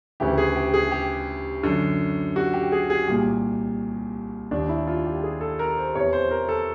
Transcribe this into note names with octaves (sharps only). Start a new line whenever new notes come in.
D2 C#3 E3 G4
G#4
G4
G#4
G4
F#2 D3
F#4
G4
G#4
G#4
C2 A#2 G4
D#2 D#3 D4
E4
F4
G4
G#4
A4
A#4
C5
E2 C3 E3 C#5
C5
A#4
A4